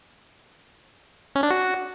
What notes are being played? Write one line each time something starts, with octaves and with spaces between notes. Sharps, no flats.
C#4
D4
F#4